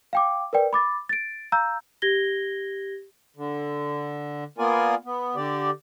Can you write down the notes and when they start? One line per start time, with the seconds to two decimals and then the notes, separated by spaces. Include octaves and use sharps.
0.13 F5 G5 D6
0.53 A#4 B4 D5 G5
0.73 B5 D6 A6
1.09 A6 D7
1.52 F5 A#5 E6 G6
2.02 G4 G#6 A#6 G7
3.36 D3
4.58 A#3 B3 F4 A#4 D5 G#5
5.05 B3
5.36 D3 G4 D5